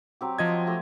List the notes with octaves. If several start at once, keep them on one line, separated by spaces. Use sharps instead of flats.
F#3 C4 G4
F3 D#5 G#6
A3 G4